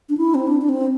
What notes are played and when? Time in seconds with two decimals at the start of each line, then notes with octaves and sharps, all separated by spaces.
0.09 D4
0.18 E4
0.35 C4
0.47 D4
0.61 D4
0.69 C4